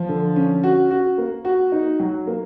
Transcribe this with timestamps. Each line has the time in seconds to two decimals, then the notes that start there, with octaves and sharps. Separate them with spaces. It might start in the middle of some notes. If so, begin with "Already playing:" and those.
Already playing: F3
0.08 D3
0.36 C#4
0.63 F#4
0.91 F#4
1.18 A#3
1.45 F#4
1.72 D#4
2.00 F#3
2.27 A#3